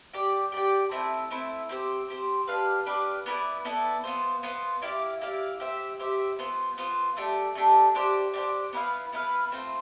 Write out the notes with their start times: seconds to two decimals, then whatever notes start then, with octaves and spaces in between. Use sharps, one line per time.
0.13 G4 D5 G5
0.52 G4 D5 G5
0.91 A3 C4 E4
1.31 A3 C4 E4
1.69 C4 G4 C5
2.09 C4 G4 C5
2.47 D4 G4 B4 F5
2.86 D4 G4 B4 F5
3.26 B3 E4 A4 D5
3.65 B3 E4 A4 D5
4.04 B3 F4 C5
4.43 B3 F4 C5
4.82 E4 G4 D5 F5
5.21 E4 G4 D5 F5
5.60 G4 C5 E5
6.00 G4 C5 E5
6.39 B3 F4 C5
6.78 B3 F4 C5
7.17 A3 D4 G4
7.55 A3 D4 G4
7.95 D4 G4 C5
8.34 D4 G4 C5
8.73 B3 E4 B4 F5
9.13 B3 E4 B4 F5
9.51 A3 C4 F4 C5